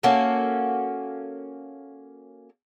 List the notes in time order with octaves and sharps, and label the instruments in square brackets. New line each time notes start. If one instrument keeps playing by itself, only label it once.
[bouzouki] A#3 C#4 F#4 A4